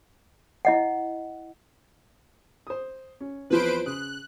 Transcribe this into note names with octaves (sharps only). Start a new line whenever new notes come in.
E4 D#5 F#5
C5 D#6
C#4
E2 F3 C4 B4 C5 D7
C#3 D#6 F#6